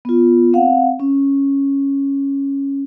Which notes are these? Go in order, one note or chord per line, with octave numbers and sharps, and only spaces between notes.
B3 F4
C4 F5 F#5
C#4